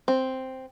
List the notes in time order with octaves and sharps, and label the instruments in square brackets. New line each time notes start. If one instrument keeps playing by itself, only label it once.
[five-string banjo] C4